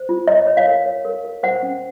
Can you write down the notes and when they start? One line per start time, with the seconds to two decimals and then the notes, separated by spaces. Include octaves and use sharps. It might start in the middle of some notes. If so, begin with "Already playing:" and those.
Already playing: C5
0.09 F4
0.28 C#5 D#5
0.47 C#5
0.57 F5
0.67 A#4
0.86 C#5
1.05 A#4
1.25 A#4
1.43 C5 F#5
1.63 C#4